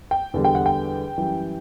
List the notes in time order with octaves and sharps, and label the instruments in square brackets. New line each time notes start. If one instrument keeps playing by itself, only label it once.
[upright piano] G5
E2 D3 G3
G5
F#5
G5
F#2 E3 G3